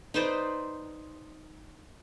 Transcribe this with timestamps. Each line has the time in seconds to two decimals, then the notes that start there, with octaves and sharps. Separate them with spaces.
0.14 D#4 B4 C5 D5